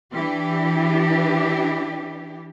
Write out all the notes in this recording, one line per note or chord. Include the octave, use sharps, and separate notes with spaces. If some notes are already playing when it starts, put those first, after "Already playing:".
E3 D4 G4